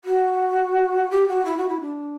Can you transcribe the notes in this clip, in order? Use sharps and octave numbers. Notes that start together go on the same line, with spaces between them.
F#4
G4
F#4
E4
F#4
E4
D4